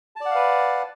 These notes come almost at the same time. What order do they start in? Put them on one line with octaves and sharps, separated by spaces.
A5 D5 F#5 F5 B4